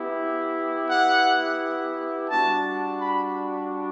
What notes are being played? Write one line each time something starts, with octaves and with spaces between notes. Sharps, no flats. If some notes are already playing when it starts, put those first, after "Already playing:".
Already playing: B3 E4 G4
F#5
G3 D4 F#4 A5
B5